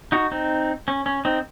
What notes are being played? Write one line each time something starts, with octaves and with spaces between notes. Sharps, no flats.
D#4 F#4
C4 D#4
C#4
C#4
C4 D#4